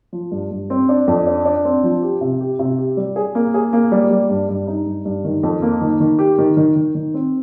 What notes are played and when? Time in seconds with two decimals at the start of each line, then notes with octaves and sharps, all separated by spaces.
0.13 F3
0.31 G2
0.51 G2
0.70 C4
0.89 D4
1.08 F2
1.27 D4
1.45 D4
1.65 C4
1.84 F3
2.02 G4
2.21 C3
2.41 G4
2.59 C3
2.78 G4
2.97 G3
3.16 G#4
3.35 A#3
3.54 G#4
3.73 A#3
3.92 G3
4.11 G3
4.30 G2
4.49 G2
4.67 D#4
4.86 G2
5.05 G2
5.24 D#3
5.43 F2
5.62 A#3
5.81 D#3
6.00 D#3
6.19 G4
6.38 D#3
6.57 D#3
6.76 D#3
6.95 D#3
7.14 C4